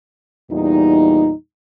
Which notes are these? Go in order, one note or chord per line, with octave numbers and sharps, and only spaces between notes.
E2 A#2 G3 D#4